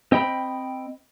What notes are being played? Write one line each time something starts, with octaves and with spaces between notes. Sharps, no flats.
C4 D#5 G5 B5